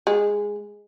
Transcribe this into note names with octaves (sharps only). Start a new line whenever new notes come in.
G#3